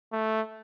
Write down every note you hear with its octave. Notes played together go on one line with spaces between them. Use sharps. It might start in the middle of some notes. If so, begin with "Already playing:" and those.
A3